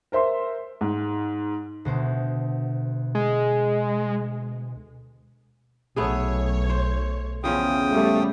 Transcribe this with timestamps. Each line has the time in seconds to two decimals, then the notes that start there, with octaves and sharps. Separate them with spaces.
0.12 A#4 C5 E5 C6
0.81 G#2
1.85 D2 B2 C5
3.15 G#3
5.96 B1 A3 B3 G#4 C#5
6.70 C5
7.44 E2 C#3 F3 C#4 G5 D#6
7.91 A2 G3 A3